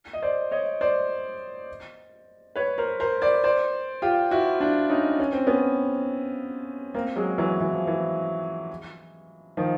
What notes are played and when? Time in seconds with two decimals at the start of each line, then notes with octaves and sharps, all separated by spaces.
0.13 D#5
0.22 C5 D5
0.51 C#5 D#5
0.81 C5 D5
2.56 B4 C#5
2.78 A#4 C5
3.00 A#4 C5
3.22 C5 D5
3.44 C5 D5
4.02 F4 G4
4.31 E4 F#4
4.61 D4 E4
4.90 C#4 D#4
5.20 C#4
5.33 C4
5.47 B3 C#4
6.94 A#3 C4
7.16 F#3 G#3
7.38 E3 F#3
7.60 E3
7.73 F3
7.87 E3
9.57 D#3 F3